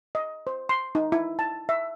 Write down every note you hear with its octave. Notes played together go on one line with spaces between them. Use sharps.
D#5
C5
C6
D#4
E4
A5
E5